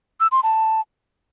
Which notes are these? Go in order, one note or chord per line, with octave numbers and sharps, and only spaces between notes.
E6
C6
A5